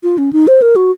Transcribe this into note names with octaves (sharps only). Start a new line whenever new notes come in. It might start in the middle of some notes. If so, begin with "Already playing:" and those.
F4
C#4
D#4
C5
A#4
F#4